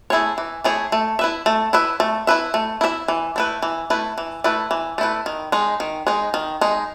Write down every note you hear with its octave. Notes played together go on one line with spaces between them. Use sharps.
A3 E4 G#4 C#5
E3
A3 E4 G#4 C#5
A3
E4 B4 E5
A3
E4 B4 E5
A3
E4 B4 E5
A3
E4 B4 E5
E3
A3 E4 B4
E3
A3 E4 B4
E3
A3 E4 B4
E3
A3 E4 B4
D#3
G#3 D#4
D#3
G#3 D#4
D#3
G#3 D#4